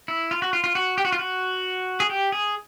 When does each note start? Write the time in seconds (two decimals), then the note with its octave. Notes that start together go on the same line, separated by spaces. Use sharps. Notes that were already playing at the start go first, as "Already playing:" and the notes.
0.08 E4
0.31 F4
0.42 F#4
0.53 F4
0.64 F4
0.75 F#4
0.98 G4
1.05 F#4
1.12 F4
1.19 F#4
2.00 G#4
2.10 G4
2.32 G#4